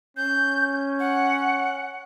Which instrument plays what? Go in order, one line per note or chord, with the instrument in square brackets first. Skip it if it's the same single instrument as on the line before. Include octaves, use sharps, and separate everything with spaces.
[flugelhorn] C#4 [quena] G6
[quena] F#5